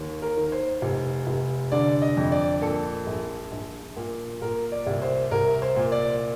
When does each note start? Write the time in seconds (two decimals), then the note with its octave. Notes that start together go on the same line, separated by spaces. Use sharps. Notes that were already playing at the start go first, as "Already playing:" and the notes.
Already playing: D#2
0.22 A#4
0.37 D#3
0.52 C5
0.82 F1
1.27 F1
1.72 D3 D5
2.02 D#5
2.17 F2
2.32 D5
2.62 A#2 A4
3.07 A#1
3.52 A#1
3.97 A#2
4.42 A#2 A#4
4.72 D5
4.87 C2
5.02 C5
5.31 C2 A#4
5.62 C5
5.76 A#2
5.92 D5